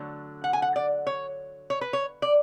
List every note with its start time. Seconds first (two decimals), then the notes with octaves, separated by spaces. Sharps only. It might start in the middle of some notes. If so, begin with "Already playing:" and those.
Already playing: D3 F#3 A3
0.44 F#5
0.53 G#5
0.62 F#5
0.76 D5
1.07 C#5
1.70 C#5
1.81 B4
1.93 C#5
2.22 D5